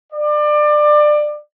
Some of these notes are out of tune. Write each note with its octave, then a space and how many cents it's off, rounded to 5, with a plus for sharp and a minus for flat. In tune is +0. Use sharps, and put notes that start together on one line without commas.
D5 +25